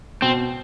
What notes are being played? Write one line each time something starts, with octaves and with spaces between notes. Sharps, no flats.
B2 C4